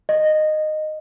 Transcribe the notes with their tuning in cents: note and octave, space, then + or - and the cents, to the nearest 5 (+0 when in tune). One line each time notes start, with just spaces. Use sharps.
D#5 -15